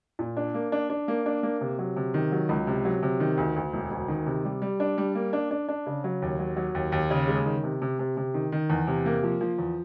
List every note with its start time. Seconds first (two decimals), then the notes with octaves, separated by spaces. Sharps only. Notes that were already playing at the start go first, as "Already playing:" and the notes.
0.19 A#2
0.37 D4
0.54 A#3
0.72 D4
0.90 D4
1.08 A#3
1.26 D4
1.43 A#3
1.61 C3
1.79 F#3
1.97 C3
2.14 D#3
2.32 F#3
2.49 C#2
2.67 C3
2.85 F#3
3.03 C3
3.20 D#3
3.37 D2
3.56 D2
3.73 E1
3.91 D2
4.08 D#3
4.26 C3
4.45 G3
4.62 G3
4.80 D4
4.98 G3
5.15 A#3
5.33 D4
5.51 D4
5.69 D4
5.86 C#3
6.04 F#3
6.22 D#2
6.39 F#3
6.57 F#3
6.75 D#2
6.92 D#2
7.11 C#3
7.28 G#3
7.46 D#3
7.63 C3
7.82 C3
7.99 C3
8.17 C3
8.34 D#3
8.52 D#3
8.70 E2
8.87 C3
9.06 A#3
9.23 F3
9.41 F3
9.58 E2